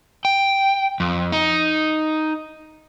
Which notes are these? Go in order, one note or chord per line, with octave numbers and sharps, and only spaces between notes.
G5
F2
D#4